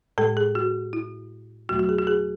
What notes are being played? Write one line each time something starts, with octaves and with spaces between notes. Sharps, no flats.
A2 G#3 A4
G#4
F#4
E4
E2 B2 F#3 A3 F#4
F#4
G#4
F#4
G#4